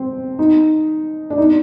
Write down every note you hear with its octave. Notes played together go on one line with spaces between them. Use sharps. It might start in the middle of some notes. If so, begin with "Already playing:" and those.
Already playing: C4
D#4
D4
D#4